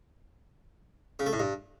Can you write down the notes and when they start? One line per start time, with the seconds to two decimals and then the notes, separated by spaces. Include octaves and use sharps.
1.19 C#3
1.26 A3
1.33 A2
1.40 G2